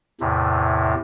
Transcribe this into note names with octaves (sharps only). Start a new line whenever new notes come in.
E2 A2 C3